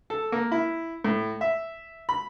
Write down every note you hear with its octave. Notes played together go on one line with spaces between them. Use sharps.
A4
A#3
E4
A2
E5
B5